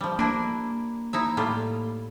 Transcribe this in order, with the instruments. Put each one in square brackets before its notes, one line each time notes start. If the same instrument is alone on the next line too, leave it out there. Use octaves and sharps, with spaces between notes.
[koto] F3 G3
[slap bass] A#3 [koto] D4 E4
[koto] D#4 E4 E5
A2 G3 F4